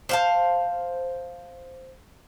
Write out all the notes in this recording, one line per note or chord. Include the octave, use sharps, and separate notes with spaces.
C5 F5 A5